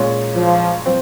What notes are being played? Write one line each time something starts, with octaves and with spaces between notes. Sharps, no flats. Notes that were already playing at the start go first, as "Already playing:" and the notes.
Already playing: A#2 G#3 C#4
F3
F3 C4